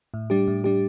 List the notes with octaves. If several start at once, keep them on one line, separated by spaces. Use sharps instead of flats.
A2
G3 D4 G4
A2
G3 D4 G4